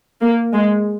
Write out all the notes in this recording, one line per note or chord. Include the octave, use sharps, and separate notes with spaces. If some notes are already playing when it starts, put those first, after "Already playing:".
A#3
G#3